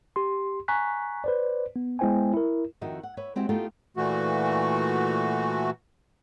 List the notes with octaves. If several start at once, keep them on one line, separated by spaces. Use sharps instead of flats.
G4 C6
G#5 A#5 C#6 F#6 B6
B4 C5 D5
B3
G#3 B3 E4 C5 G5 G#5
E4 A#4
F2 D#3 F#4 D#5 E5
F#5
B4 C#5 E5
G#3 C4 E4 F#4 G4
A3 B3 D#4 F4 G4 A4
A#2 E3 A3 F#4